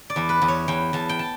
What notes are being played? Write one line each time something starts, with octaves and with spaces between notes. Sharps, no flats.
D5
E2
B4
E2
C#5
E2 G5
E2 A5
G5
A5